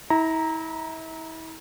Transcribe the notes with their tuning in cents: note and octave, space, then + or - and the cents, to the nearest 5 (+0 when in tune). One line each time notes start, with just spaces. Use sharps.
E4 -35 A#5 +0